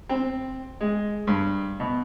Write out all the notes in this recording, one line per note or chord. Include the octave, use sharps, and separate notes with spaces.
C4
G#3
G2
B2